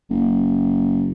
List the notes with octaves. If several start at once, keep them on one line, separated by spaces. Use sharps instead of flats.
F#1